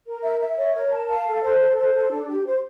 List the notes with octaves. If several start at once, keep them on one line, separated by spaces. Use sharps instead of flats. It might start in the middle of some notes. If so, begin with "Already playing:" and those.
A#4
E5
E5
C#5
A#4
A5
F5
A4
C5
A4
C5
A4
D4
G4
C5